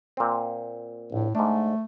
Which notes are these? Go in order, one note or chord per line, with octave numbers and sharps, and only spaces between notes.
A#2 C4
A#1 A2
G#2 A3 D4